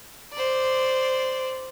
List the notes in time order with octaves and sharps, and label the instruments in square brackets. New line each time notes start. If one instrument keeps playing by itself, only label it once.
[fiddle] C5 D5